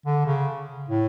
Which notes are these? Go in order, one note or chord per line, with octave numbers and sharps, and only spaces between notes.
D3
C#3
A2